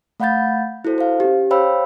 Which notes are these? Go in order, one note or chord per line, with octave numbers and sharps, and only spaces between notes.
A3 F5 F#5 B5 G6 A6
E4 F#4 A4 C5
C5 F5
C#4 G4
C5 C#5 F5 G5 B5 E6